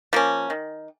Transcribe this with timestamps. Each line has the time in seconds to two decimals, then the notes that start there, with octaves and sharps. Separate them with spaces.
0.13 F3 A#3 C#4
0.50 D#3